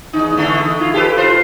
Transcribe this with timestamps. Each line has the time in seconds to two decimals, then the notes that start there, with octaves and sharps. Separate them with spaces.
0.13 E2 D#4
0.37 E2 D3 A3
0.62 D#4
0.80 E4 F4
0.94 G4 A4 B4
1.17 F4 C5